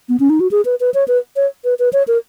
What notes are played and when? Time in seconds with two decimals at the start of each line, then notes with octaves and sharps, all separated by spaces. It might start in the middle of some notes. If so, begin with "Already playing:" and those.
0.09 B3
0.20 C#4
0.30 D#4
0.40 F#4
0.51 G#4
0.65 B4
0.80 B4
0.94 C#5
1.08 B4
1.36 C#5
1.65 B4
1.79 B4
1.93 C#5
2.08 A#4